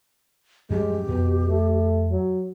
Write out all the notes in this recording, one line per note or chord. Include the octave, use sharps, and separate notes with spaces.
F#2 F3 G3 G#3 G4
F2 B2
A3
F#3